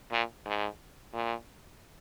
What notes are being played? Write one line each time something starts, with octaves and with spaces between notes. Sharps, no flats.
A#2
G#2
A#2